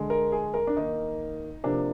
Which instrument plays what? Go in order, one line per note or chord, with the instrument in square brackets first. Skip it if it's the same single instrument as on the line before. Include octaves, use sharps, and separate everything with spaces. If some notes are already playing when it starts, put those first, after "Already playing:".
Already playing: [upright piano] D3 G#3
A#4
G#4
A#4
D4
D#3 A#3 D#4
C3 F3 A#3 D4